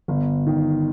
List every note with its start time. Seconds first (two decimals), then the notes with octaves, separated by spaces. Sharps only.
0.08 G1
0.47 D#3